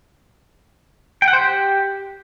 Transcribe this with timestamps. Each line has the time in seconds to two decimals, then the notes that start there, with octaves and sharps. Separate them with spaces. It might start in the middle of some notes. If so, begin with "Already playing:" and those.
1.22 G5
1.28 F#5
1.33 C5
1.39 G4